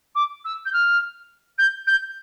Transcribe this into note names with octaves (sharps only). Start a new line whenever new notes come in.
D6
E6
G6
F6
G6
G6